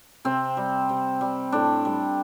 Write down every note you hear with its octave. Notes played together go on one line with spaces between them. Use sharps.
C3 C4
G3
C3
G3
A2 D4
G3